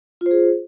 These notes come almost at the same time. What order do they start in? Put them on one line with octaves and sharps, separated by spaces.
F4 C5 G#4